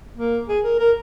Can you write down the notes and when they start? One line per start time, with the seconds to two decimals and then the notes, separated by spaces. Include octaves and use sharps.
0.17 A#3
0.48 G#4
0.64 A#4
0.79 A#4